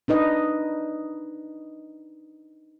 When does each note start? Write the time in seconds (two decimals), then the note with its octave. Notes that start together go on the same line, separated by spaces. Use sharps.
0.08 D4 D#4 B4 D#5